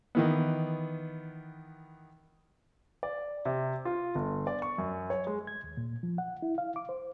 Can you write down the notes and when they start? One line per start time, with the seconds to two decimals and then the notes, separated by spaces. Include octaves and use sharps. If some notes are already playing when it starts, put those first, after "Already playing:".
0.15 D#3 E3 B3
3.03 D5
3.45 C3
3.85 F4
4.15 G1
4.47 D5
4.62 C#6
4.78 F#2
5.10 C#5
5.27 G#3
5.47 G#6
5.64 D#2
5.77 A#2
6.03 F3
6.18 F#5
6.42 E4
6.58 F5
6.76 D6
6.89 C5